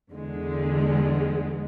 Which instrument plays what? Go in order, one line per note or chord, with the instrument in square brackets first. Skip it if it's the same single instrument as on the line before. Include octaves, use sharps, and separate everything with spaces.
[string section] E2 D3 G#3